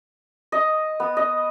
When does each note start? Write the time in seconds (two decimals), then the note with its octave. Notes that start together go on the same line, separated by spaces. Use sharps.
0.52 D#5
1.00 B3
1.17 D#5